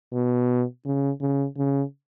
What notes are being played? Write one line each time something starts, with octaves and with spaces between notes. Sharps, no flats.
B2
C#3
C#3
C#3